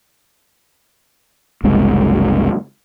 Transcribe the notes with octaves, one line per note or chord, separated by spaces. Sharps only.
F#1 C2 G#3 C4